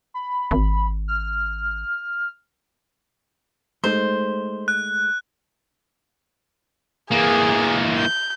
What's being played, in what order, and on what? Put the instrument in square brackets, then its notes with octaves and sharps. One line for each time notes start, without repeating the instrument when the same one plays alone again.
[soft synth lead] B5
[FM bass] G#1
[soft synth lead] F6
[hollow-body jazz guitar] G#3 A3 D#4 [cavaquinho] C5
[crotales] F#6
[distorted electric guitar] E3 A#3 [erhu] G#4
[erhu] G6